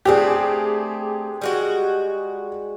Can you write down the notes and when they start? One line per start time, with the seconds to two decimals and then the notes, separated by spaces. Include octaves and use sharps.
0.05 A3 C4 D4 G4 G#4
1.41 G3 G#3 F#4